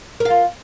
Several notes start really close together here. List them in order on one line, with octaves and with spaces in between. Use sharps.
A#4 F5 F4